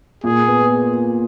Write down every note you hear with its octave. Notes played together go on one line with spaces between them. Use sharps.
A#2 G#4
B3